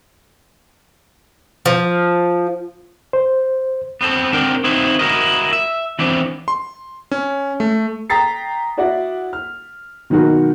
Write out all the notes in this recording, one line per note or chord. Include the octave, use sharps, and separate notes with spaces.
F3
C5
B3 C4 A4
C4 D4 A#4 F#5 G5
C4 D#4 E4 F#4 B4 C5
E4 F#4 A#4 D#5
E5
E3 B3 C4 D4
C6
C#4
A3
G5 A#5 D#6 A6 B6 C7
E4 F#4 D5 E5 F#5
F6
B2 D#3 F#3 D#4 F#4 A#4